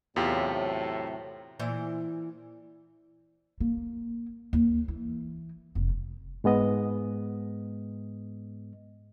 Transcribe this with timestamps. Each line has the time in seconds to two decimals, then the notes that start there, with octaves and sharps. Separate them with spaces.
0.16 E2 A2 C3 F#3 C4 F4 G4
1.60 A#2 E3 C5
3.60 A#3
4.53 D#2
4.88 E3
5.75 F1
6.44 G#2 G#3 B3 D#5